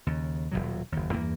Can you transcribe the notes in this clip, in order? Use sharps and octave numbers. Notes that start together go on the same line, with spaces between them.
D#2 C#3
D#1 C#2 B2 F#3
F#1 D#2
E2 G2 E3 A#3